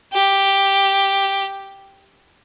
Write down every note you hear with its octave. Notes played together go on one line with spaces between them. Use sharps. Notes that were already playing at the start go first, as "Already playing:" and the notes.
G4